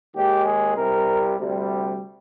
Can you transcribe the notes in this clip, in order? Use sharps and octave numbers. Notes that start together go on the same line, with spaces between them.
D#2 D#3 G#3 G4
G#4
C2 C3 G3 A#4
D2 C3 G3